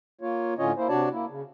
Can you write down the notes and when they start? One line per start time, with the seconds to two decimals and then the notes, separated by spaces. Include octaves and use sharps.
0.21 A#3 F4 C#5
0.58 A2 D3 C#4 F4 C#5 D#5
0.77 A#3 E4 C5
0.89 C3 D4 F#4 C#5 D5 A5
1.12 A#3 E4
1.28 C#3